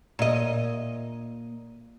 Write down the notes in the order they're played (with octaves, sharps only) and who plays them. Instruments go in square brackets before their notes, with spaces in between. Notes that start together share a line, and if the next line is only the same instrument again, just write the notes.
[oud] A#2 D#5